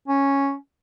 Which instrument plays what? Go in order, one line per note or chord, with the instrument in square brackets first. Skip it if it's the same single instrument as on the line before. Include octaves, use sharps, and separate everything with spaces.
[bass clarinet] C#4